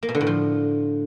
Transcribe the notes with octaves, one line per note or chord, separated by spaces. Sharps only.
A#3
B2
D3
A2
F3